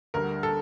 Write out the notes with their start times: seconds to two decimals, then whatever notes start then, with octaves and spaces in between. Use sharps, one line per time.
0.14 D2 D3 G3 A#4
0.43 A4